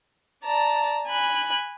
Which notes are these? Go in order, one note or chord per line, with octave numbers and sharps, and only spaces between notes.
D5 A5 A#5
G#5 B5 F#6